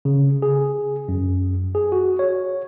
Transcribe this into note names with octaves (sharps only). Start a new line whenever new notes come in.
C#3
G#4
F#2
G#4
F#4
C#5